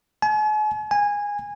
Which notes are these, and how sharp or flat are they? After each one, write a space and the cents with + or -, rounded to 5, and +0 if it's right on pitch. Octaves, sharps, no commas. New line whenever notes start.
G#5 +45
G#5 -15